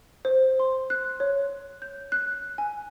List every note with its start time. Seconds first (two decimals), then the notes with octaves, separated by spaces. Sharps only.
0.25 C5
0.60 C6
0.90 F#6
1.20 C#5
1.82 G6
2.12 F#6
2.58 G#5